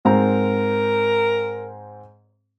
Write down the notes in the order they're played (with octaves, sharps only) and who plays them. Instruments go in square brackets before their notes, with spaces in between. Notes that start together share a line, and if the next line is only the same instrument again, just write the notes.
[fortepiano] G#2 C4 A#5 [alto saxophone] A#4